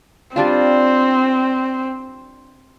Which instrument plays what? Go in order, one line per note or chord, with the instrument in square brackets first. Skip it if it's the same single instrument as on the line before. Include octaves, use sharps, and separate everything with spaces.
[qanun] G3 D4 F4 [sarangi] C4